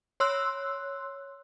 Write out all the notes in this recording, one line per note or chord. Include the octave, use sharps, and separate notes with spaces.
C#5 C6 E6 F#6